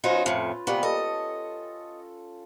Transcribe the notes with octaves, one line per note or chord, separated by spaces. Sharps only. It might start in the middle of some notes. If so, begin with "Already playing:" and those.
F#3 C#4 D#4 F4 B4 C5
F2 A2
C3 G3 A#3 B3 C#6
A4 D#5